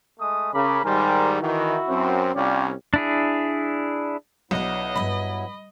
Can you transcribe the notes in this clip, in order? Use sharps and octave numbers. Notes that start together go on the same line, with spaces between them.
G#3 A3 D#6
C#3 A#4 B5 D6
G#2 D#3 G3 A#4 C5 G#5
D#3 E3 E4 F#4
F#2 C4
C2 C#4 F4 D5 G5
D4 E4 G#4
B1 F#3 B3 D4 E4 D5 D#5
D2 G2 B5